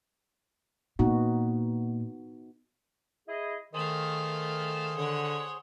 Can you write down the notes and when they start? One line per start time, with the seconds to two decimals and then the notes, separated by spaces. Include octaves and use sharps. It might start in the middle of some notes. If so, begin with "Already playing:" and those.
0.99 A#2 B3 D#4 F#4
3.29 E4 G#4 D#5
3.74 D#3 A3 G#4 C5 F5
4.96 D3 C#5 F#5